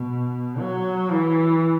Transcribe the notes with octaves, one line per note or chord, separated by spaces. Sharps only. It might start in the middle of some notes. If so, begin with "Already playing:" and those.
Already playing: B2
F#3
E3